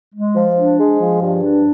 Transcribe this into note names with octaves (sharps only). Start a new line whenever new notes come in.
G#3
F3
D4
G#3
F3
G2
D4